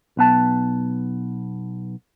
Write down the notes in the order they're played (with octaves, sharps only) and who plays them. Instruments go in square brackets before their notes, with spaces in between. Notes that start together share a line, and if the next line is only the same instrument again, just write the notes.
[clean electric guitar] B1 B3 A5